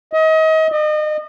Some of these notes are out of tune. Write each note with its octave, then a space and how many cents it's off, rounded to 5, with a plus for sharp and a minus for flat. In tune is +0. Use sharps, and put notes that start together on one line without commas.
D#5 +35
D#5 -35